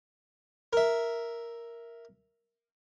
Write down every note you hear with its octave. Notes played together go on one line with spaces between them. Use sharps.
A#4 E5